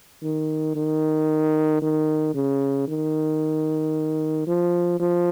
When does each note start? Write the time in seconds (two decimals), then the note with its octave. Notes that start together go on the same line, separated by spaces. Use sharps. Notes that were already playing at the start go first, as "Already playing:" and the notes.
0.23 D#3
0.76 D#3
1.82 D#3
2.35 C#3
2.88 D#3
4.47 F3
5.00 F3